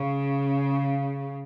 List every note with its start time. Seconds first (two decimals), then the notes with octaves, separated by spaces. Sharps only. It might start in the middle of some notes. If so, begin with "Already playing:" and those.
Already playing: C#3